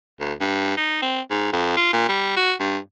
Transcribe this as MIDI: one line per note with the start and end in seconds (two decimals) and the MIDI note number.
0.20 0.33 38
0.41 0.75 43
0.77 0.98 63
1.02 1.21 60
1.31 1.51 44
1.53 1.76 41
1.77 1.91 65
1.93 2.08 46
2.09 2.36 55
2.37 2.53 66
2.60 2.78 43